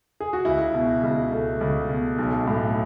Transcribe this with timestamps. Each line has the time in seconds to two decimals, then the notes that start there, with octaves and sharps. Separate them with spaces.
0.20 G#4
0.33 F#4
0.45 C#2 E4
0.74 B2
1.03 C#2
1.32 A3
1.61 C#2
1.90 B2
2.18 B1
2.47 A2